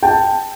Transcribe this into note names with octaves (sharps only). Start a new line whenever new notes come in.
G5 A5